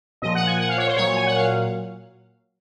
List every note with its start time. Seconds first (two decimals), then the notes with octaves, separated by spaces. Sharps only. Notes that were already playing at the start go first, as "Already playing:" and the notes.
0.22 A#2 F3 D#5
0.35 F#5
0.47 G#5
0.59 F#5
0.69 F5
0.78 C#5
0.87 C5
0.96 A#2 F#3 C#5
1.16 G#5
1.26 F#5
1.36 F5